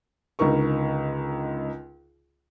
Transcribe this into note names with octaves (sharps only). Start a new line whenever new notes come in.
C#2 D3 D#4 A#4 C#6